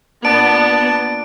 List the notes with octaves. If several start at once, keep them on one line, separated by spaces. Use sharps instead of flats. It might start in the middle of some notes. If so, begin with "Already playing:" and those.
A#2 B3 D4 A5 D7